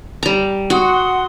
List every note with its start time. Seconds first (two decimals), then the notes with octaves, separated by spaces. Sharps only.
0.23 G3 A#5
0.70 F#4 F#5 C6 D#6